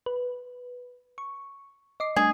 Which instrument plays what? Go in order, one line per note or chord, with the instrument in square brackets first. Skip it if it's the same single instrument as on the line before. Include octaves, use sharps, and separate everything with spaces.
[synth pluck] B4
C#6
D#5 D6 C7
[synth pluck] G3 A3 D4 [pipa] G#4